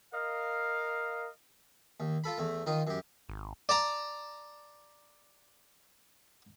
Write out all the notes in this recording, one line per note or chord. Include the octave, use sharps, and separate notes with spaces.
A#4 D#5 F5
D#2
F4 A4 B5
E2 A3
D#3 D#4 F4
F#2 G4
G#1
D5 A5 A#5